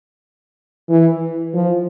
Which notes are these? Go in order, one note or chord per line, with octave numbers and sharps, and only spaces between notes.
E3
F3